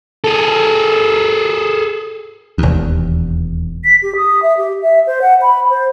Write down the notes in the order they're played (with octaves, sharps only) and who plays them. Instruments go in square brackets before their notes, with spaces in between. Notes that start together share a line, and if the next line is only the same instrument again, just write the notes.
[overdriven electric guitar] G#4 A4
[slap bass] E1 D#2
[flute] B6
G4
D#6
E5
G4
E5
C5
F#5
B5
C5